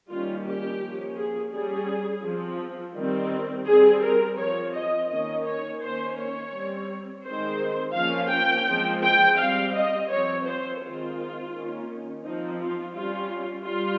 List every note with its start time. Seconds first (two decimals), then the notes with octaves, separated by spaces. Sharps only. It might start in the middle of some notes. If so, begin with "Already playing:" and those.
0.09 D#3 G3 A#3 C#4 F4
0.46 G4
0.82 F3 A#3 C#4
1.16 G#4
1.52 G3 C#4 G#4
2.24 F3 C4
2.95 D#3 G3 C4
3.66 G3 C4 G#4
4.02 A#4
4.38 F3 C4 C#5
4.74 D#5
5.09 D#3 A#3 C#4 D#5
5.46 C#5
5.81 D#3 A#3 C#4 C5
6.18 C#5
6.52 G3 C4
7.24 D#3 G#3 C4 C5
7.96 F3 A#3 C#4 F5
8.31 G5
8.67 F3 G#3 C4
9.03 G5
9.38 G3 C4 F5
9.74 D#5
10.10 F3 C4 C#5
10.46 C5
10.81 D#3 G#3 C4 F4
11.53 D#3 A#3 C#4
12.24 F3 C4 D#4
12.61 F4
12.95 G3 C#4 F4
13.67 G3 F4